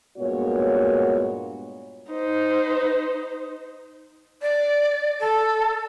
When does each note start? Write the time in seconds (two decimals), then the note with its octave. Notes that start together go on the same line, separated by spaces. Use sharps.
0.18 G2 A#2 G#3 B3 F#4 C#5
2.11 D#4 C5
4.42 D5
5.20 A4